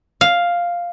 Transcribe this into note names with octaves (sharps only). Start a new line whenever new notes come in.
F5